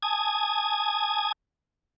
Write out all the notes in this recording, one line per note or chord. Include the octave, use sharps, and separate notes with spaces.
G#5 A5 D#6 G#6